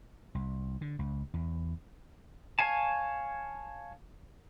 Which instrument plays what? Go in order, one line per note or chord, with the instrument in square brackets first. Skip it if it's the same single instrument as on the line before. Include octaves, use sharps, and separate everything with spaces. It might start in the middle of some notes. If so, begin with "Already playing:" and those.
[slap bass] C2
D3
C#2
E2
[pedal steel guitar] C#5 F5 G#5 A5